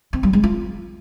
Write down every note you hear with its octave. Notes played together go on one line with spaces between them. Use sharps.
C4
G3
G#3
F4